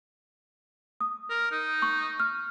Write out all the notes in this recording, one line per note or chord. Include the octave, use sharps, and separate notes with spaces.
D#6
A#4
D#4
C#6
F6